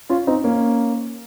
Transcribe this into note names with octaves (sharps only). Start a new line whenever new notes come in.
C#4 F4
C4 D#4
A#3 C#4